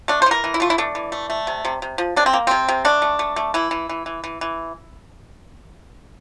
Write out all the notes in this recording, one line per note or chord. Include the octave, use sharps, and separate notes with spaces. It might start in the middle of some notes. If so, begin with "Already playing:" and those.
A3 D4
C5
E3 A#4
E3
E4
A3 F4
E4
A3 D4
E3
A3
A3
C3
C3
C3
F3
C3 D4
C4
A#3
C3 C4
C3
A3 D4
A3
A3
A3
E3 E4
E3
E3
E3
E3
E3